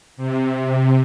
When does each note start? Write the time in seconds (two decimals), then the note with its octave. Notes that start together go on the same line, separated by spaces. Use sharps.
0.17 C3